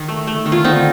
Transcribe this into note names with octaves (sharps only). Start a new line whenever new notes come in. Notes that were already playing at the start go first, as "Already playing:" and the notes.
Already playing: D#3
A3
A3
D#3
F4
D3 C4 D#4